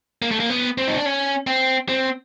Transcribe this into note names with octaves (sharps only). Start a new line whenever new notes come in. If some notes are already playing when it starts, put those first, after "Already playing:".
A#3
A3
A#3
B3
C4
D#4
D4
C#4
C4
C4